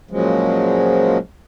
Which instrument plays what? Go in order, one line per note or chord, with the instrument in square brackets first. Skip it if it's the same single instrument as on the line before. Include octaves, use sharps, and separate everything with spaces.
[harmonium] A#2 C#3 F3 F#3 G#3